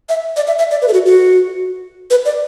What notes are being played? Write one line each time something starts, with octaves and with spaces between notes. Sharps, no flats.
E5
D5
E5
E5
D5
B4
A4
F#4
F#4
B4
D5